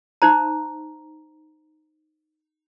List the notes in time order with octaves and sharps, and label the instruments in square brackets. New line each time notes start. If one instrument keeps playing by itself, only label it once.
[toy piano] D#4 C5 A#5